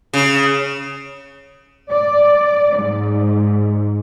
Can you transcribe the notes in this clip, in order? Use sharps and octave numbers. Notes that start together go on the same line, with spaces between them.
C#3
D5
G#2